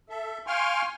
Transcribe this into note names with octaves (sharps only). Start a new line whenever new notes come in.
A4 E5
F5 G5 G#5 C6 C#6 F6